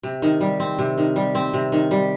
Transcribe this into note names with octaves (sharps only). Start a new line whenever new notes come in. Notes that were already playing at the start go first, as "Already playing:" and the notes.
C3
D#3
G3
C4
C3
D#3
G3
C4
C3
D#3
G3